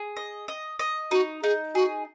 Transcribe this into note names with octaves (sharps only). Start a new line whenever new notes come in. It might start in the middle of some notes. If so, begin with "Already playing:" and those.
Already playing: G#4
D#5
D#5
D#5
D#4 F#4
D#4 G#4
F#4 G#4